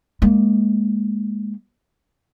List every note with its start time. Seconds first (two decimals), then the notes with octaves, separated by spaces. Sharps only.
0.22 G#3 A#3